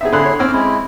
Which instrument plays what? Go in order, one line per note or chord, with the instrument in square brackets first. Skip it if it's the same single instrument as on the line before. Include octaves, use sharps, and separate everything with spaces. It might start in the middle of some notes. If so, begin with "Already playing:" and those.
[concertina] B3 C4 D#4 [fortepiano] G#4 E5
[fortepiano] D3 F#6 [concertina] E4 G#4 C6
[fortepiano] C#5
[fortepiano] C4 C#4 [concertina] D6 E6 F6
[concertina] G#3 E4